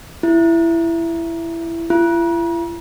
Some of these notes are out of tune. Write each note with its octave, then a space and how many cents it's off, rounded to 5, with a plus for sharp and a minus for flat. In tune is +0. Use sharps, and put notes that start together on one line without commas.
E4 +15
E4 +45